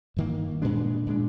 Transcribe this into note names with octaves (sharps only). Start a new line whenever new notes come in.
G2 D#3 A#3
A#2 G#3 D4
A#2 G#3 D4